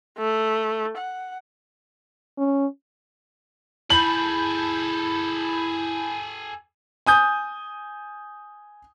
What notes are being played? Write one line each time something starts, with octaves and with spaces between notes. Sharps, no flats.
A3
F#5
C#4
E4 G#4 A4 A5 B5 G6 F#7
G#5 D#6 G6